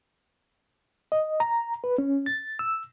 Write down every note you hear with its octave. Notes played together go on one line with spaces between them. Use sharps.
D#5
A#5
B4
C#4
A6
E6